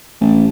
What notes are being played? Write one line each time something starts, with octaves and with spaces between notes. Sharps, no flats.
A1